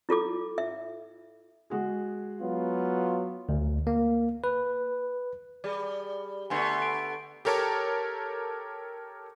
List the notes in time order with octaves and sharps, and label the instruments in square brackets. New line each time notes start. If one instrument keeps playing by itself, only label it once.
[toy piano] E4 F4 A4 D6
E5
[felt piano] G#3 F#4 G#4
[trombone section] F#3 B3 F4
[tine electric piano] D2
A#3
B4
[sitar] G3 [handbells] G#4 D5
[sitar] D3 A3 B3 [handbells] G#5 C6 C7
[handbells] D7
[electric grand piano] G4 A4 A#4 C#5 A5 D6